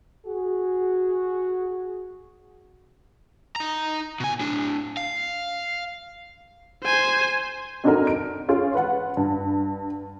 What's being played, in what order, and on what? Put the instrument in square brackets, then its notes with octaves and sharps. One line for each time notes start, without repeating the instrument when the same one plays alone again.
[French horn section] F#4 G#4
[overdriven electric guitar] D#4 A#5
B2 G#5
A2 D4
F5
[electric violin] C5 G#5
[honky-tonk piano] C4 D4 D#4 F#4 A4 A#4
D7
C#4 F4 G#4
B4 F#5
G2